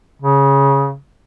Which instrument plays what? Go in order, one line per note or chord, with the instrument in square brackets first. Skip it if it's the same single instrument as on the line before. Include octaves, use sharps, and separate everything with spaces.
[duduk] C#3